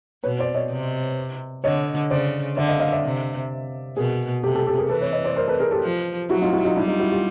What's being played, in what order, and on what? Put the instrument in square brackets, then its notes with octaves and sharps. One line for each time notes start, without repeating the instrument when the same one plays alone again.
[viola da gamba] B2 [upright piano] B4 C#5
[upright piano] C5 D5
C#5 D#5
[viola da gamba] C3
[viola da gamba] D3 [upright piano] C#5 D#5
[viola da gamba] C#3 [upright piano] C5 D5
[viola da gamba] D3 [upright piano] D5 E5
[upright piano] D#5 F5
D#5 F5
D5 E5
[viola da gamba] C3
[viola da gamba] B2 [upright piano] G#4 A#4
[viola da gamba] C3 [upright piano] G4 A4
[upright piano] G4 A4
G4 A4
G#4 A#4
[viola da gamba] E3 [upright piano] A4 B4
[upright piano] B4 C#5
C#5 D#5
C5 D5
A#4 C5
A4 B4
G#4 A#4
G4 A4
[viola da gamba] F3
[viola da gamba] F#3 [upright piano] E4 F#4
[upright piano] D#4 F4
E4 F#4
D#4 F4
[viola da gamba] G3 [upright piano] D4 E4
[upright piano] D#4 F4
E4 F#4
F4 G4